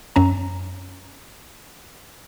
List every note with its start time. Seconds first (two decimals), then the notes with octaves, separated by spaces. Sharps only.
0.16 F#2 C#4 A#5